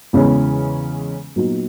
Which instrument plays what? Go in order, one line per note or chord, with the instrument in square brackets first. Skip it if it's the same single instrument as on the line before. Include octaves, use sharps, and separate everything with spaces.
[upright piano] E2 C#3 E3 G#3 C#4
A#2 F#3 B3 D#4